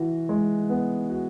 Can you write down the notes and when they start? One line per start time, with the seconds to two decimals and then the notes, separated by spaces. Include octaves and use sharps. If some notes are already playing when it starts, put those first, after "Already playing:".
Already playing: E3 F#4
0.29 G#3
0.70 B3
1.10 F#4